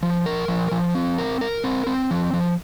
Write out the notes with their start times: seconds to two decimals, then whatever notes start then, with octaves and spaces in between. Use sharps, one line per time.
0.03 F3
0.26 A#4
0.48 F3
0.71 F3
0.95 C4
1.18 A#4
1.41 A#4
1.64 C4
1.87 C4
2.11 F3
2.33 F3